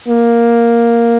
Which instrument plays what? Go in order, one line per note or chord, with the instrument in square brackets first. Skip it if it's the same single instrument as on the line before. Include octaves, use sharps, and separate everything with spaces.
[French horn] A#3